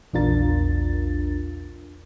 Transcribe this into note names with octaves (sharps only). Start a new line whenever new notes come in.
A#1 E2 D4 F4 A#4 A6